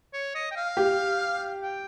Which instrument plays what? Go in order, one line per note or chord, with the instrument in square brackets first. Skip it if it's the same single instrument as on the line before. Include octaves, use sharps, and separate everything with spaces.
[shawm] C#5
D#5
G5
F5
[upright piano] G4
[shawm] G5